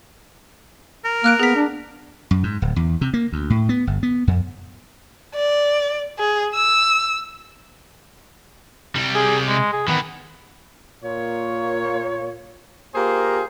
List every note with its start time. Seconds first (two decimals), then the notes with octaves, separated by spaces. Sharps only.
1.05 A#4
1.24 A#3 F6 F#6 D7
1.40 B3 G#4 B6
1.56 D4
2.31 F#2
2.43 G#2
2.62 D1
2.76 E2
3.01 C3
3.14 A#3
3.32 D2
3.50 A2
3.69 B3
3.87 G1
4.03 B3
4.27 F2
5.35 D5
6.19 G#4
6.54 E6
8.96 C3 G3
9.15 G#4
9.48 G#3
9.72 G#4
9.88 D#3 E3 B3
11.03 A#2 A#3 F4 C#5
12.94 A#3 F4 G4 G#4 A#4 C5